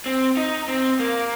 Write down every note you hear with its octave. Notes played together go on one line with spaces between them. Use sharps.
C4
D#4
C4
A#3